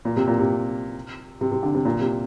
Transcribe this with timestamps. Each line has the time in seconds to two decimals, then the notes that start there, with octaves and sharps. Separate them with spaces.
0.05 A#2
0.16 C3
0.27 A#2
0.39 C3
1.41 C3
1.52 C3
1.63 D3
1.74 C3
1.85 A#2
2.01 C3